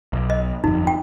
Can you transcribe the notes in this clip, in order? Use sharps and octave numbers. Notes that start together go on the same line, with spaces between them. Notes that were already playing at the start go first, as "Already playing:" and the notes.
B1
D#5
G1 F2 D#4
G5